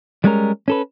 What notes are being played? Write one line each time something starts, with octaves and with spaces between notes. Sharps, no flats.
G3 G#3 C#4 A#4
C#4 A4 B4